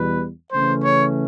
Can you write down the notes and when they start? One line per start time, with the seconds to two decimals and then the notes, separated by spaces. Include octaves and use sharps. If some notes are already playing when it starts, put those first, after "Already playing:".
Already playing: E2 B2 G3 B4
0.53 C#3 E3 A3 C#4 C5
0.83 C#5